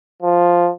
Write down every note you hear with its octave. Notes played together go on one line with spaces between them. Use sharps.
F3